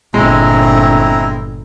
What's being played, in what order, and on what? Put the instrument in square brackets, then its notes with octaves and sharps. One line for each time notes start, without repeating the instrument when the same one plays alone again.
[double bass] G1 A#2 [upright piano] G#3 [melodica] C4 E4 A#5